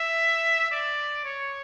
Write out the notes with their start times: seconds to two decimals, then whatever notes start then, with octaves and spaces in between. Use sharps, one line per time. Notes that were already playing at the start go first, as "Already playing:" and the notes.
Already playing: E5
0.71 D5
1.24 C#5